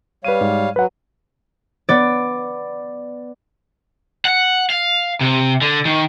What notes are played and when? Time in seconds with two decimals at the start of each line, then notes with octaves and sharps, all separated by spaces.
0.25 G3 B4 C#5 F5 D#7
0.41 G#2
0.76 F#3 B4 F#5
1.89 B3 D5
4.25 F#5
4.70 F5
5.21 C3
5.62 D3
5.85 D#3